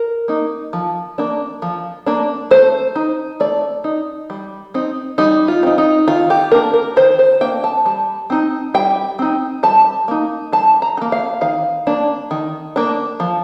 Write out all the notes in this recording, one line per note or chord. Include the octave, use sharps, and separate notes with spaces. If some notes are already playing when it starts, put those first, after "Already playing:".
Already playing: A#4
A#3 D#4
F3
A#3 D4
F3
A#3 D4
A3 C5
D#4
A3 D5
D#4
G3
C4 D#4
G3 D#4
F4
C4 D#4
D#4
D#3 F4
G4
A#3 D4 A#4
A#4
D#3 C5
C5
A#3 D4 G5
A5
G3 A5
C4 D#4
G3 G5
C4 D#4
G3 A5
A#3 D#4
G3 A5
A#5
D#4
A#3
F5
D#3 F5
A#3 D4
D#3
A#3 D4
F3